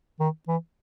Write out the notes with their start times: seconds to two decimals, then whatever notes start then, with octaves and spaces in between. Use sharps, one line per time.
0.20 D#3
0.48 E3